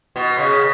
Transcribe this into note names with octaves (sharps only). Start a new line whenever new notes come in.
B2
C#3